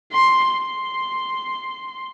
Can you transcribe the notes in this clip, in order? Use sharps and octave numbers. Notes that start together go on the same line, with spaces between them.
C6
C6